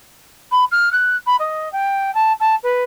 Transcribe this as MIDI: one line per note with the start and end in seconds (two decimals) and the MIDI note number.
0.51 0.64 83
0.71 0.91 89
0.92 1.16 90
1.26 1.36 83
1.39 1.71 75
1.72 2.13 79
2.14 2.32 81
2.40 2.55 81
2.63 2.83 71